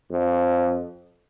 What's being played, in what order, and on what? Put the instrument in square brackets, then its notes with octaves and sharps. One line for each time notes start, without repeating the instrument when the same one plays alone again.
[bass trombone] F2